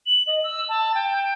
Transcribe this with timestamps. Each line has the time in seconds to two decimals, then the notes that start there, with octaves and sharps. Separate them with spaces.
0.06 F#7
0.27 D#5
0.44 E6
0.69 A5
0.95 G5